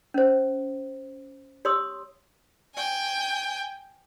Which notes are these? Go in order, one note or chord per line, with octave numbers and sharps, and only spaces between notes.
C#4 C5
G4 C#5 C6 D#6 E6
G5 G#5